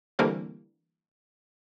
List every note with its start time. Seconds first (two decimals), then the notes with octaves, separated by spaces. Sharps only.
0.19 D3 E3 G3 A3 A#3 C4